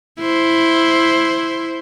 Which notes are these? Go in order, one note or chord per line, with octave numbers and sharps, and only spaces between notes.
E4 C5